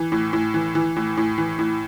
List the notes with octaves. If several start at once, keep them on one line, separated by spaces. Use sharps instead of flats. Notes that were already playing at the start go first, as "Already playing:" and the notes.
Already playing: E3
A2
A2
E3
E3
A2
A2
E3
A2